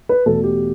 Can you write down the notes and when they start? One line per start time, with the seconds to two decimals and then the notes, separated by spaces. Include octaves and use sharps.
0.09 B4
0.26 E2 B2 A3 A4
0.44 G4